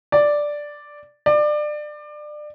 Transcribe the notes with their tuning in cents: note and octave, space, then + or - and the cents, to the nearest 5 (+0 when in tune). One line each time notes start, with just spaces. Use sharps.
D5 +0
D5 +25